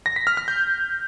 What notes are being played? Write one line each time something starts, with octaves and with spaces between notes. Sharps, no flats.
A#6
B6
F6
F6
G6